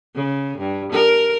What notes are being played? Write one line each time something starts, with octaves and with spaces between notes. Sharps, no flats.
C#3
G2
A#4